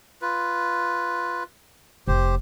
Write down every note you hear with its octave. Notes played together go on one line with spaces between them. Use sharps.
F4 B4
F1 G4 C5